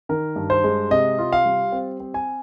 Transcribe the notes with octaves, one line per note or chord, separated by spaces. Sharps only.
D#3 A#4
G2
C5
G#3
C3 D#5
F4
F5
G3
C4
C4
G#5